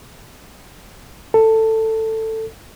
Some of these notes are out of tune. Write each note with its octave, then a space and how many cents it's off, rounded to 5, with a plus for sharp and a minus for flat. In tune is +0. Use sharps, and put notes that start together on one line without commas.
A4 +15